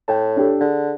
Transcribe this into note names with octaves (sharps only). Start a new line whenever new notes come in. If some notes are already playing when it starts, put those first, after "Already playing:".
A2 G5 A5
D4 G4 A4
D3 G#4